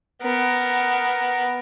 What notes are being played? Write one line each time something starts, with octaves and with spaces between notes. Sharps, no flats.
B3 A#4